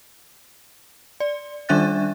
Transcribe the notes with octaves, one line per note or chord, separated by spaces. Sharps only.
D5
D#3 G3 D4 E5 F#6 A6